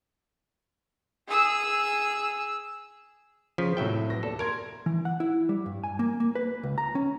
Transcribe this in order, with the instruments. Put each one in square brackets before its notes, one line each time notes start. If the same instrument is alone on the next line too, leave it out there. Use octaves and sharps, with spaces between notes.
[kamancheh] G#4 E6
[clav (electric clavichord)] C#3 F3 [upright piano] B6
[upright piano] A2 C3 [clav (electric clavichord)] F#3 E5 G5
[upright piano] B3 A#6
[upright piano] D#2 D5 [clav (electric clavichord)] A4
[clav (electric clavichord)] A#4 [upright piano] C6 G#6 D7
[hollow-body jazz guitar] E3
F#5
E4
G3
G2
G#5
A#3
A#3
B4
C#2
A#5
C#4